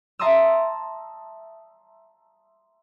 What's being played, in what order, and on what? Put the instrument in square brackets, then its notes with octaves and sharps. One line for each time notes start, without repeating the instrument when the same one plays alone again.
[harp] E5 A5 A#5 C6 D#6 E6